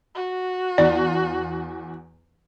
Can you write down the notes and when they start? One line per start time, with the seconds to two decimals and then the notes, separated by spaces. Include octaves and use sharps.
0.15 F#4
0.78 E2 D5